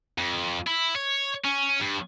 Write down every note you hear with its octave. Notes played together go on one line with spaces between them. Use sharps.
F2
E4
C#5
C#4
G2